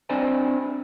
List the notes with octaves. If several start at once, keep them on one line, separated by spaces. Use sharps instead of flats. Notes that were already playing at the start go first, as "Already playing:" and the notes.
C4 D4 E4 C5 D5 G#5